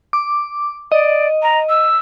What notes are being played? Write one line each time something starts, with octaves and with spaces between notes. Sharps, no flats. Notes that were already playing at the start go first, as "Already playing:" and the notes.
D6
D5 D#5
A#5
E6